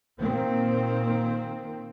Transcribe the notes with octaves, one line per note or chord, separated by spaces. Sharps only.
A#2 D#3 A#3 C4